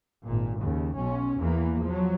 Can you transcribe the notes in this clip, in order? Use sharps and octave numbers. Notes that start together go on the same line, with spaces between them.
G#1 A#2
D#2 C#3
B1 C#4
E2 E3 A#3
F3 F#3